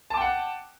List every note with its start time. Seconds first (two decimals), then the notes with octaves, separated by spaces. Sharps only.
0.10 A5
0.14 D6
0.17 G5
0.21 F#5